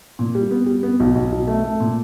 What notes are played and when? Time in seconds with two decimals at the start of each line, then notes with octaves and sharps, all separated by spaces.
0.19 A#2
0.35 G3
0.51 B3
0.66 G3
0.83 B3
1.00 B1
1.15 B1
1.32 B1
1.47 A3
1.64 A3
1.80 A#2